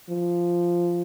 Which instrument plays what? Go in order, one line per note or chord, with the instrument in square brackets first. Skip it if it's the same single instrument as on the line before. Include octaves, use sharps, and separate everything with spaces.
[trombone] F3